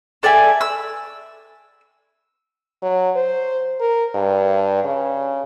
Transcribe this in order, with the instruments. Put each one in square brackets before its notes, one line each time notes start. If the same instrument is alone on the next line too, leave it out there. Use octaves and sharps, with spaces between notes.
[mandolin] A4 D5 E5 G#5
E6
[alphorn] F#3
C5
A#4
G2
C#3